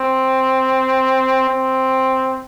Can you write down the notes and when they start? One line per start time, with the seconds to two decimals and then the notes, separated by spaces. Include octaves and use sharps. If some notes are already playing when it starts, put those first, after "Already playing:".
Already playing: C4
1.48 C4